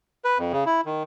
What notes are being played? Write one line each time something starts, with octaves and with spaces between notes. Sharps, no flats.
B4
F2
C#3
E4
D#3